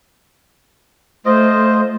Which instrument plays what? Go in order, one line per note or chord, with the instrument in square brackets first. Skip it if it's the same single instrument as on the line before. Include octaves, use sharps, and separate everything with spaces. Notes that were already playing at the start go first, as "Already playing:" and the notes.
[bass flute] A3 [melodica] F4 D#5 [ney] C5